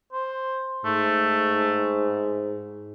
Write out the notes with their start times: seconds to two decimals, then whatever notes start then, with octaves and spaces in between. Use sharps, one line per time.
0.13 C5
0.85 G#2 A3